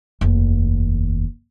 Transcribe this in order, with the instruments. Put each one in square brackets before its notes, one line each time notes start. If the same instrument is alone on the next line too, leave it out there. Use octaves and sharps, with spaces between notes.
[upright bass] F1 D#2